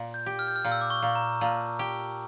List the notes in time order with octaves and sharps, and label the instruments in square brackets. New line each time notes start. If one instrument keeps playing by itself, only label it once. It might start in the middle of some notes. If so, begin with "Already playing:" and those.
Already playing: [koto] A#2
[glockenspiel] G6
[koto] G4
[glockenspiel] F6
G6
F6
[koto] A#2
[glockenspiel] E6
D6
C#6
[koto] A#2
[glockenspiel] C#6
A#5
[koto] A#2 [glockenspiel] A5
[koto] G4